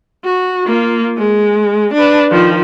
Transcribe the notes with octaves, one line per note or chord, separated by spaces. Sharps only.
F#4
A#3 F4
G#3
D4 B4
D#3 F3